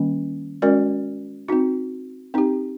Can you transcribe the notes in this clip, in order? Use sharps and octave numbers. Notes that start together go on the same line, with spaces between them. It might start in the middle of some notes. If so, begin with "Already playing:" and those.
Already playing: D#3 G3 A#3 C#4
G#3 C#4 F#4 A#4 D5
C4 D#4 F#4
C4 D#4 G4